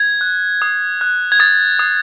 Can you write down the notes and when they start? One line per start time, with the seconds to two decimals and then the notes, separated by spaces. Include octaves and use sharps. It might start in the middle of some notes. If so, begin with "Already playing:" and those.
Already playing: G#6
0.21 F#6
0.62 D#6
1.01 F#6
1.32 G#6
1.40 D#6 A6
1.79 D#6